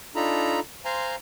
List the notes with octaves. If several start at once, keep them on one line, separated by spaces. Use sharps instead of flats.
D4 D#4 F4 A4 A#5 B5
C5 F5 G#5 A#5 C6